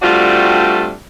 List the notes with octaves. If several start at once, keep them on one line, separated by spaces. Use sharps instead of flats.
G3 A3 C4 D4 F4 F#4